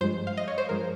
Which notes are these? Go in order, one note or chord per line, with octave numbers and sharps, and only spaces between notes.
G2 F3 G#3 C5
F5
D#5
C#5
C5
G2 F3 G#3 A#4